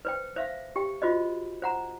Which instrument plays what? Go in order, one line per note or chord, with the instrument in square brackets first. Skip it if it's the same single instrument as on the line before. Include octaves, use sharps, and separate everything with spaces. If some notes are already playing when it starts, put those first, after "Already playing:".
[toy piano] B4 C5 G5
C5 E5 F5
G4 G5
F4 F#4 C5 D#5
C5 F#5 A#5